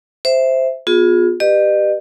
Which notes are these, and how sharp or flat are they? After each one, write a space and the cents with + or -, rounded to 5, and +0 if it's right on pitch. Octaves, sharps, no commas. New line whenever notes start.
C5 +0 E5 +0
B3 +0 F4 +35 G#4 +0
G4 +0 B4 +0 D#5 -40